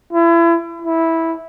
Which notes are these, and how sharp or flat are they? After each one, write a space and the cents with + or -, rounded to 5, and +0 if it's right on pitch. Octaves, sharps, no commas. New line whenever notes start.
E4 +35
E4 -10